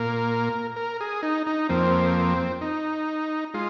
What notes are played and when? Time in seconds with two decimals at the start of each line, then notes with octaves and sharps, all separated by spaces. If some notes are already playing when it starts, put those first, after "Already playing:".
Already playing: A#2 A#3 A#4
0.76 A#4
1.01 G#4
1.23 D#4
1.47 D#4
1.69 F2 F3 A#3 C4
2.61 D#4
3.54 G#3 F4